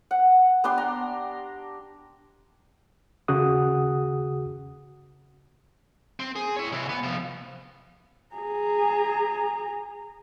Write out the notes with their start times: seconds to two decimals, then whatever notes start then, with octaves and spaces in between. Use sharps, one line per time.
0.11 F#5
0.64 B3 D4 G4 C6
0.78 A#5
3.28 D#2 C#3 F#4 G#4 F#5 D#6
6.20 C4
6.36 G#4
6.56 E4 C#5
6.72 C3 E3
6.89 B3
7.03 C3 F3
8.35 G#4 A#5